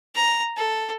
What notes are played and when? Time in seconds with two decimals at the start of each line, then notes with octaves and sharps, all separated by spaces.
0.15 A#5
0.57 A4